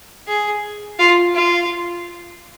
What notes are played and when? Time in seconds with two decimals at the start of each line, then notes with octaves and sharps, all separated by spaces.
0.27 G#4
0.99 F4
1.35 F4